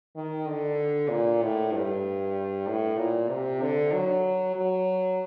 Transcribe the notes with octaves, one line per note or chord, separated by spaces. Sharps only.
D#3
D3
A#2
A2
G2
A2
A#2
C3
D3
F#3
F#3